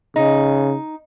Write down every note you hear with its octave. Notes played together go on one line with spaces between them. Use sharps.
C#3 D#4